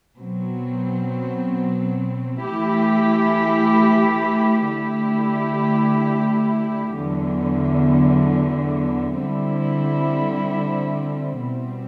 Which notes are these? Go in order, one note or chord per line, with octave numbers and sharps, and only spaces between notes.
B2 F#3 C4
E3 A3 E4 G4
D3 A3 E4 G4
E2 D3 F#3
D3 G3 C4 E4
B2 G3 C4